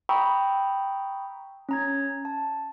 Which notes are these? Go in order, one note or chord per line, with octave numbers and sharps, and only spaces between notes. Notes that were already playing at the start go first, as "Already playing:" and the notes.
G5 A#5 B5 C#6 D#6 E6
C#4 A#5 G#6
A5